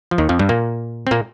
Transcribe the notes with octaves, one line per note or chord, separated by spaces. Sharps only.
F3
D#2 D#3
F2 F3
G2 G3
A#2 A#3
C4
A#2 A#3